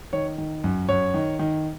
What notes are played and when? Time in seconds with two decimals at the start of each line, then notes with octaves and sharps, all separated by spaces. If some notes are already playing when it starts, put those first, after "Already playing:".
0.13 D#3 C#5
0.38 D#3
0.64 F#2
0.89 F#2 C#5
1.14 D#3
1.39 D#3